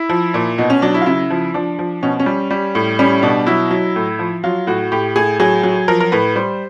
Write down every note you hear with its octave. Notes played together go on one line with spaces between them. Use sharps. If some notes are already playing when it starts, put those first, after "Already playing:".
Already playing: E4
F3
A#2
B2 D#4
C#4
F#3 D4
E4
F4
C#3 E4
F3
F3 D4
F3
B2 C#4
C#4
G3
G3
A2
G3 C#4
B2 D4
F#3 E4
F#3
A2
F3
F#3 F4
A2 F#4
A2 G4
A2 G#4
F#3 G#4
F#3
F3 A#4
A#4
A2 B4
G3 C5